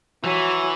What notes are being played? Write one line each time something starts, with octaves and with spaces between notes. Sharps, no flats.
E3 F#3